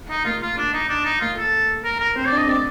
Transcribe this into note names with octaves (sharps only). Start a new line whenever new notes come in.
D#4
A#3 F4
F4
D4
D#4
D4
D#4
A#3 F4
A4
A#4
A#4
C4 C5
D5
D4
D#5
C4 D5